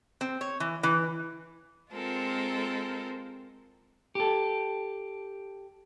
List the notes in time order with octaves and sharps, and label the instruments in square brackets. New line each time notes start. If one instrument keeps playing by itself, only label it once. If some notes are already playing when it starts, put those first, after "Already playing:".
[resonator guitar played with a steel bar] C4
C#5
E3
E3
[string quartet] G#3 C4 F4 A4 A#4
[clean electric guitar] G4 A4